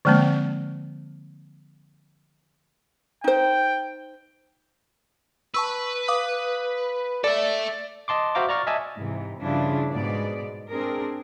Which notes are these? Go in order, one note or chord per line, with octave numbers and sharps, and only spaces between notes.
D3 F3 G#3 A#3 C4
D#4 C5 G5
B4 A5 C#6 E6
F5 D6 D#6
A4 D5 E5
D#5 A5 C6 D6
F#4 C5 E5 F5 A#5 D6
D5 A#5 C#6 F6 A6
D#5 E5 G#5 A5
G#2 C3 E3
G2 C#3 F3 D4 E4 F4
G#2 B2 G#3 B3 D5
C4 D4 G#4 A#4